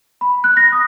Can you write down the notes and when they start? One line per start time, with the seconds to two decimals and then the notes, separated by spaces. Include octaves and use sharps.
0.21 B5
0.44 F#6
0.57 A#6
0.72 D#6